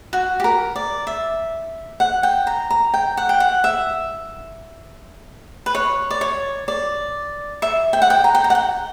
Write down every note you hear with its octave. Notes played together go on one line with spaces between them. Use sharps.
F#4
G4
A#4
D5
E5
F#5
G5
A#5
A#5
G5
F#5
G5
F#5
E5
B4
C#5
D5
C#5
D5
E5
G5
F#5
G5
A#5
G5
A#5
F#5
G5